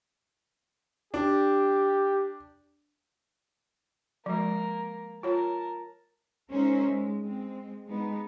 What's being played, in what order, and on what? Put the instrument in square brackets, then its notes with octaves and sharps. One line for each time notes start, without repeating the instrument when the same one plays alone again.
[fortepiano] D4 [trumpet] G4
[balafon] F3 G#3 [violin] A#3
[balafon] F4 C#5 [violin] A#4 A5
[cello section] G#3 C#4 D#4 A#4 C5 E5
G#3
G#3 C4
G#3 B3 D#4